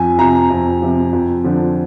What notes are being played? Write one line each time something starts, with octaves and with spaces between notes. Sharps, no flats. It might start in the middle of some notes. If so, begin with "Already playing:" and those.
Already playing: F2 G#5
C3 F3 A#5
F2
C3 F3
F2
D3 F3